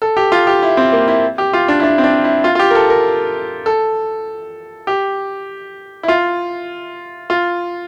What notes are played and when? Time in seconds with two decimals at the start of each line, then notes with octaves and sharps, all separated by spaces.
0.02 A4
0.17 G4
0.32 F4
0.47 G4
0.62 E4
0.77 C4
0.93 A#3
1.08 E4
1.38 G4
1.53 F4
1.68 D4
1.80 E4
1.83 D4
1.98 C4
2.04 D4
2.24 E4
2.44 F4
2.55 F4
2.59 G4
2.71 A#4
2.75 A4
2.90 A#4
3.66 A4
4.87 G4
6.03 E4
6.08 F4
7.30 F4